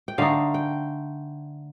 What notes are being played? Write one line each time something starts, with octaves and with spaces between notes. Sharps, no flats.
G5
D3 A3 D#4 F5
G5